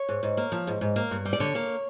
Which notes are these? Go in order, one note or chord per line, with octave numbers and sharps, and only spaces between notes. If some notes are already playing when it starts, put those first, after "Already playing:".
Already playing: C#5
G#2
G#2
A#3
F3
G#2
G#2
A#3
G2
G3
D5
D3 C#5
A#3